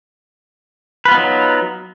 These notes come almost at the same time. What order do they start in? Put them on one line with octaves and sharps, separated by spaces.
B4 F4 B3 D#4 F#3